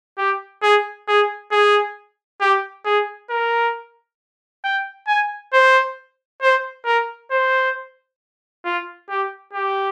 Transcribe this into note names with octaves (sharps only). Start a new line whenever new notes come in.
G4
G#4
G#4
G#4
G4
G#4
A#4
G5
G#5
C5
C5
A#4
C5
F4
G4
G4